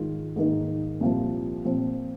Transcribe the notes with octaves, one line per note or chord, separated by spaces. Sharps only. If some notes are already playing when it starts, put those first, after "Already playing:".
Already playing: G#2 D#3 G#3 F4
G#2 D#3 A#3 D#4
C2 A#2 F3
A#2 F3 C4